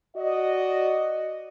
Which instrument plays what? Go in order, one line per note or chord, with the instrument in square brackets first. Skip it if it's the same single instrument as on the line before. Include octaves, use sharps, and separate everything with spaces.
[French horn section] F#4 D5 D#5